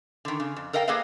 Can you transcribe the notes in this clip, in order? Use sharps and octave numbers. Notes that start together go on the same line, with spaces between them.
D3 D#3
C#3
F2
A4 A#4 D#5 F5 G5
A#3 G#4 A4 B4 D#5 F5